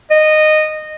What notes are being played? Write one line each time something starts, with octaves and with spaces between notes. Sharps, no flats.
D#5